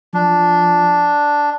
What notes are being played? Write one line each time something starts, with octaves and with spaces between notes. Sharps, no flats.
F3 D4